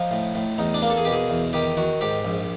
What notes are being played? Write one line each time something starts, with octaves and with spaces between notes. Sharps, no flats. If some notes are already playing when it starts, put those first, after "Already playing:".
Already playing: F3 D#4
A2
A2
E2 D#4
D4
A#3
A4
G#4
B2 G4
G#4
E2
D#3 G4
D#3 F#4
G#2 G4
A#1